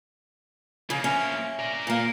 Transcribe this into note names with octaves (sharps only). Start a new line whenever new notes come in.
C#3 F3 A#3
C#4 E5
A#4 D5
A#2 A#3